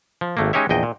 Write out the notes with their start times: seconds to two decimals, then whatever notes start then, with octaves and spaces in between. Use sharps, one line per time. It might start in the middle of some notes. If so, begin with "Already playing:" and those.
0.21 F3
0.37 G#1 A3 A#3
0.53 G#3 C#4 D#4 G4 C#5 E5
0.69 A#1 E2 D#5 G5
0.83 A#2